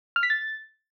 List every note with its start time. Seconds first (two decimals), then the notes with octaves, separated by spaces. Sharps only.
0.16 F6
0.23 B6
0.30 A6